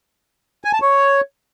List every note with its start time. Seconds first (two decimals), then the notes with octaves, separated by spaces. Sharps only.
0.64 G#5
0.73 A5
0.82 C#5